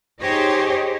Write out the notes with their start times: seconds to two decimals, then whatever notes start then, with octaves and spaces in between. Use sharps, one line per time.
0.20 D#4 G4 G#4 C5 C#5 D#5